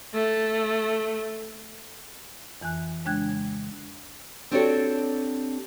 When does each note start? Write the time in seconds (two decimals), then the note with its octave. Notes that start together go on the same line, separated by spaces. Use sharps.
0.14 A3
2.61 F2 E3 G#5 F#6
3.05 C#3 G#3 D4 G5 F#6 G#6
4.51 C4 D4 F#4 G4 A4 C#5